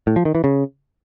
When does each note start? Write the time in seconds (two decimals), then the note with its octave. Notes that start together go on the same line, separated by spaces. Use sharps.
0.07 A2
0.16 F3
0.25 D#3
0.35 E3
0.44 C#3